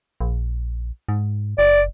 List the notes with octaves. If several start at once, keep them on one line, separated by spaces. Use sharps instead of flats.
A#1
G#2
F#1 D5